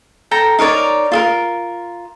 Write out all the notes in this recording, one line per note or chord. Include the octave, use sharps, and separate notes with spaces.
A4 G5 A#5
D#4 A#4 C#5 D5
F4 A4 A#4